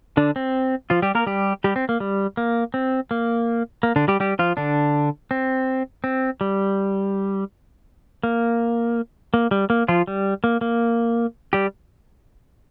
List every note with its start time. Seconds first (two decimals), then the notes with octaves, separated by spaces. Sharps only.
0.17 D3 D4
0.36 C4
0.90 F3 F4
1.02 G3 G4
1.15 A#3 A#4
1.27 G3 G4
1.64 G3 G4
1.76 C4
1.89 A#3
2.00 G3
2.37 A#3
2.74 C4
3.11 A#3
3.83 A#3
3.96 D3 D4
4.08 G3 G4
4.20 G3 G4
4.39 F3 F4
4.57 D3 D4
5.31 C4
6.04 C4
6.41 G3
8.23 A#3
9.34 A#3
9.51 G3
9.70 A#3
9.88 F3 F4
10.07 G3
10.44 A#3
10.61 A#3
11.53 G3 G4